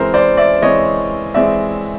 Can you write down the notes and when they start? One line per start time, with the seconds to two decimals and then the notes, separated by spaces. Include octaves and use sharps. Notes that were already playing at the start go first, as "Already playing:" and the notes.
Already playing: E3 G#3 C4 A#4 C5
0.14 C5 D5
0.37 D5 E5
0.62 E3 G#3 C4 C#5 D#5
1.34 E3 G#3 C4 D5 E5